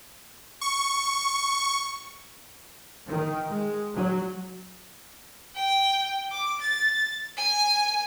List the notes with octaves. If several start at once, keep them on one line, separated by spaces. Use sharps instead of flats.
C#6
D#3
G#3
F#3
G5
D6
A6
G#5